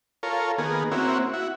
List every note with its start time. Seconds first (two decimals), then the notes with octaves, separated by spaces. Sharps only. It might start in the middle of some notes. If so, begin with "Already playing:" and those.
0.23 F4 A4 A#4 C#5
0.58 D#3 A#3 B3 G#4
0.91 A#3 C4 C#4 E4 F#4
1.33 E4 F#4